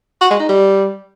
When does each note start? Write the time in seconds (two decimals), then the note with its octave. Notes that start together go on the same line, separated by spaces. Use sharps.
0.21 F#4
0.30 G#3
0.40 D#4
0.49 G3